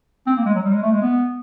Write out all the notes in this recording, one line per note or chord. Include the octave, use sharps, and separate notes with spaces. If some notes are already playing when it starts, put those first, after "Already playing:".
C4
A#3
G#3
F#3
G3
G#3
A3
G#3
B3